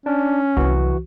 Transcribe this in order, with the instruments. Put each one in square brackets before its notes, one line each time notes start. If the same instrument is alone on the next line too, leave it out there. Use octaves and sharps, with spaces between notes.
[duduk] C#4 [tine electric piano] D4
[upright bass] C2 F#3 [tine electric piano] E3 F#4